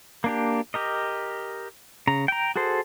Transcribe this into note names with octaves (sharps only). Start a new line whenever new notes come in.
A#3 D4 G4
G4 A#4 D#5
C#3 A#5
G5 A#5
F#4 G#4 A4 C5